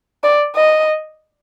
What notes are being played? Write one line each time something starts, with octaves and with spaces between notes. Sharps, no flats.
D5
D#5